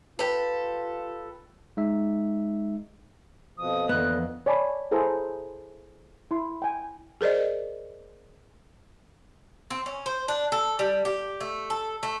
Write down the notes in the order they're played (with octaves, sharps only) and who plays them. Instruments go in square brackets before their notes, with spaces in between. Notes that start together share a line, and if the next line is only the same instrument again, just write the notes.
[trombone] F4 [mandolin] G4 A4 [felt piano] B4
[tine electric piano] G#3 D#4 E5
[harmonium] F2 B2 F3 [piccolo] D#6
[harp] F2 E3 [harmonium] A#2 D3 D#5 [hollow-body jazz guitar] B3 [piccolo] F#6
[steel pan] C#5 D5 G#5 A5 B5
E4 G#4 A4 C5 A#5
E4 C6
G5 G#5
[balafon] G#4 A#4 C5 D5 D#5
[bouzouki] C4
C#4
C5
D4
A4
G3
G4
A3
A4
A3